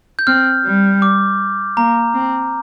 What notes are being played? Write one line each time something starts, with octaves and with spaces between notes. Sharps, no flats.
G6
C4 F6
G3
D6
A#3 A#5
C4